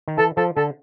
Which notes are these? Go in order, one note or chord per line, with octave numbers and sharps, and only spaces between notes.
D#3
E3 A4
F3 A4
D3 A4